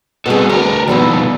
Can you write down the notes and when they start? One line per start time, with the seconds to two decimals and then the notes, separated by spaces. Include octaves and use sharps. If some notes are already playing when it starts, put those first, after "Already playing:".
0.26 B2 G3 C4 G#4 A4
0.50 D2 A#4 B4 A#5
0.88 B2 D#3 F3 G3 B3 E4